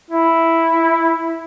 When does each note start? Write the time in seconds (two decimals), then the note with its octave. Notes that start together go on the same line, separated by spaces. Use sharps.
0.11 E4